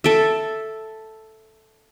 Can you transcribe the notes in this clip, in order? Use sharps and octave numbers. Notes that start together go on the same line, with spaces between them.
A4 E5